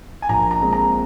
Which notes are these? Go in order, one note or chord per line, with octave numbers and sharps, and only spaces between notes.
G#5
A#1 A#5
A#5
A#2 G#3 C4
A#5